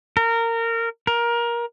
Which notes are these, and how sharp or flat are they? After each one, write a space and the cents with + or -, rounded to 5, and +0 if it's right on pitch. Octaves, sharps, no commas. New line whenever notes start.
A#4 -20
A#4 +20